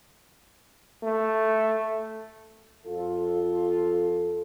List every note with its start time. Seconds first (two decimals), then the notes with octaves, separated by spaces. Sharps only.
1.03 A3
2.87 F2 F4 A4